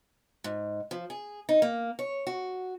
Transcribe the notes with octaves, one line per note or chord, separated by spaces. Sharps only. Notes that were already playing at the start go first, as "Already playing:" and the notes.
G#2
F3
G#4
D#4
A#3
C#5
F#4